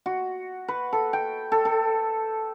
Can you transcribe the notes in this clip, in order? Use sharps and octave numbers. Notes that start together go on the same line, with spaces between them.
F#4
B4
A4
G5
A4
A4